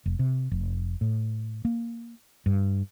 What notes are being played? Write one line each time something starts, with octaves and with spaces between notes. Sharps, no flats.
F1
C3
F1
A2
A#3
G2